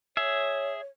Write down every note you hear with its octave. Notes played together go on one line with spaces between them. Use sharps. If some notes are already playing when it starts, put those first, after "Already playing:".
G#4 C#5 E5